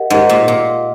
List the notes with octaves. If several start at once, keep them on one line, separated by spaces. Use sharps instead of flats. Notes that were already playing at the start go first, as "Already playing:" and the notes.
Already playing: G4 A#4 D#5 F#5
G#2 G4 A#4 D#5 F#5
A#2
A#2